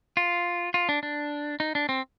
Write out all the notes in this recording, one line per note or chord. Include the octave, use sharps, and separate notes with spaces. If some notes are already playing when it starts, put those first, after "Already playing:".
F4
F4
D4
D4
D#4
D4
C4